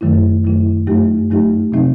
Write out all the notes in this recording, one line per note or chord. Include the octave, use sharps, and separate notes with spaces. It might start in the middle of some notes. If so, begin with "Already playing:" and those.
F#2 D#3 F#3 A3 E4
F#2 D#3 F#3 A3 E4
G2 F#3 A3 D#4 G4
G2 F#3 A3 D#4 G4
C3 F#3 C4 D#4